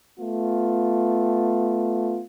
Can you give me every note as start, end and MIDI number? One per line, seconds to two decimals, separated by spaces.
0.17 2.22 57
0.17 2.22 59
0.17 2.22 65